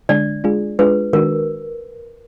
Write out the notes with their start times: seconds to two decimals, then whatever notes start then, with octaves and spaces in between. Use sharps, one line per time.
0.09 D3 G#3 D4 D5
0.44 G#3 D4 F4 G#4
0.79 G#3 D4 F4 G#4 B4
1.13 D#3 G#3 D4 F#4 A#4